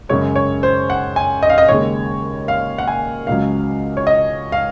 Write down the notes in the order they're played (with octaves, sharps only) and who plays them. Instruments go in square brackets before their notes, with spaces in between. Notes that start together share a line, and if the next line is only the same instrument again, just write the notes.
[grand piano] F#2 C#3 G#3 C#5
C#5
C5
F#5
G#5
D#5
F5
D#5
D#2 C#3 G#3 C#5
F5
F#5
G#5
C#2 C#3 F#3 C#4 F5
C#5
D#5
F5